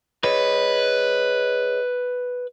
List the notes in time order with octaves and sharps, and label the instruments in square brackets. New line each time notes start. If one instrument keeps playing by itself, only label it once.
[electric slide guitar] G#4 C#5 D#5 [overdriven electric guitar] B4